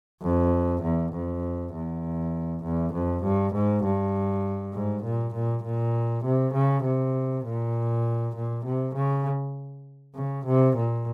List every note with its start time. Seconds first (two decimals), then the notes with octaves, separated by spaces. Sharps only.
0.22 F2
0.82 E2
1.13 F2
1.73 E2
2.64 E2
2.93 F2
3.23 G2
3.54 G#2
3.84 G2
4.73 G#2
5.04 A#2
5.34 A#2
5.64 A#2
6.25 C3
6.54 C#3
6.85 C3
7.45 A#2
8.36 A#2
8.65 C3
8.95 C#3
10.15 C#3
10.46 C3
10.76 A#2